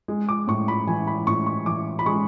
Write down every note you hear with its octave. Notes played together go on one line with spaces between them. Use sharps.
G#3
D6
A2 C#6
B5
E3 G#5
B5
A2 C#6
C#6
E3 D6
B5
G#3 C#6